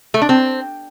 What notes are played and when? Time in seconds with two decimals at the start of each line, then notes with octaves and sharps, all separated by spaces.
0.14 A3
0.22 D4
0.29 C4